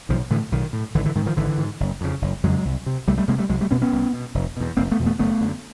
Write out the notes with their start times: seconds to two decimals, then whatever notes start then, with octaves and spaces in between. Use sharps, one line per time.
0.09 B1 D#3 F3
0.30 A2 D3 E3
0.52 B1 D#3
0.73 A2
0.95 G#1 D3 E3
1.05 D3 E3
1.15 G#2 D#3
1.26 D#3 F3
1.37 G#1 D3 E3
1.58 G#2
1.80 F#1
2.01 F2 C#3
2.22 F#1
2.44 F2 C#3 F#3 G#3
2.65 C2
2.86 C3
3.08 C2 G3 A3
3.18 G3 A3
3.28 C3 G#3 A#3
3.39 G3 A3
3.49 C2 F#3 G#3
3.61 G3 A3
3.71 B2 B3 C#4
3.82 B3 C#4
3.92 C2
4.14 B2
4.35 F1
4.57 E2 B2
4.77 F1 A#3 C4
4.91 A3 B3
4.99 E2 B2
5.06 A3 B3
5.19 F#1 A3 B3
5.41 F#2 D3